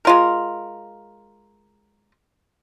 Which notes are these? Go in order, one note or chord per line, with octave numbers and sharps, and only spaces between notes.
G#3 F4 A#4